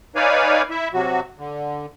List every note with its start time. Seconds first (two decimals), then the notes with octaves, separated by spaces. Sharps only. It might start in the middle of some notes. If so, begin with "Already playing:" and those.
0.16 D#4 B4 C#5 D5 F5 G#5
0.70 E4 E5
0.94 C3 F#3 F#4
1.38 D3